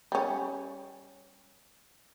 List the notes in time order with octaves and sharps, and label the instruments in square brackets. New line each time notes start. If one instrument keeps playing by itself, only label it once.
[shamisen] G3 C#4